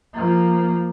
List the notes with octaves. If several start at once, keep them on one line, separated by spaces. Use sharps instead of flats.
F3 A#3